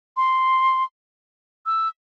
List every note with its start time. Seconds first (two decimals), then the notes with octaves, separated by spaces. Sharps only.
0.17 C6
1.66 E6